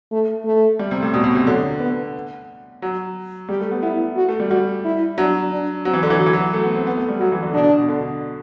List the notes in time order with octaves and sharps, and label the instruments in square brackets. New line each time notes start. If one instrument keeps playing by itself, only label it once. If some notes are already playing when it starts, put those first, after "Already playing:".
[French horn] A3
A3
[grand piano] G3
C3
A2
[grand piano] B2 [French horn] G3
[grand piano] B2
C3
[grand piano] D3 [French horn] F#3
[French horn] B3
[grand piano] F#3
[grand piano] G3 [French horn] G4
[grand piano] A3
B3
[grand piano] B3 [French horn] E4
[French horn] F#4
[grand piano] A3
G3
[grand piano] G3 [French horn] F#4
[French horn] E4
[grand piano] F#3 [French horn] D4
[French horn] D4
[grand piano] F#3 [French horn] C4
[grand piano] E3
D3
E3
[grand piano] F#3 [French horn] F#4
[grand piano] E3
F#3
A3
B3
C4
B3
A3
G3
[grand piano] F#3 [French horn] F#4
[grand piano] E3
D3
[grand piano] B2 [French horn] D4
[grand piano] B2
B2
D3